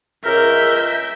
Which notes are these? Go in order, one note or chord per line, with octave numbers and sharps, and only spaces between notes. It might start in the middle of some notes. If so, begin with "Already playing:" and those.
C#2 A#4 E5 G6